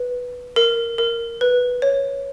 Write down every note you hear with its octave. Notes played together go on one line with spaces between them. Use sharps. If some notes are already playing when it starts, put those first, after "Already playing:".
Already playing: B4
A#4
A#4
B4
C#5